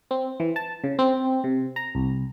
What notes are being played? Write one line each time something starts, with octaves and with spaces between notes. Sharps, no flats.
C4
E3
A5
C#3
C4
C3
A#5
C2